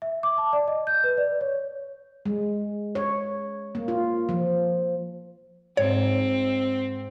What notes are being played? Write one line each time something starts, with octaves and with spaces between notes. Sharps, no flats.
E5
D6
A5
D5
D#5
G6
B4
D5
C#5
G#3
C#5
A#3
F4
F3
G#2 C4 C#5